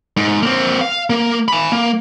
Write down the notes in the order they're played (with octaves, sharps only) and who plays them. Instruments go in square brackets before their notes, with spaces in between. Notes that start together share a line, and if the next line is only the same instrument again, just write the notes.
[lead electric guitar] G#2
A#3 C4
F5
A#3
G#5 B5
A#3